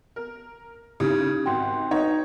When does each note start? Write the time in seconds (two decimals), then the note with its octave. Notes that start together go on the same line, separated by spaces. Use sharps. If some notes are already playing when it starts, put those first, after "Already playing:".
0.16 A#4
1.00 C#3 D#4 E4 G4
1.46 G#1 F#4 G5 C6
1.91 D#4 B4 C#5 D#5